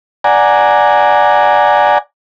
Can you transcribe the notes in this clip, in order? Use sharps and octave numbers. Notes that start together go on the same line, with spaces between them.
D5 F#5 G#5 A#5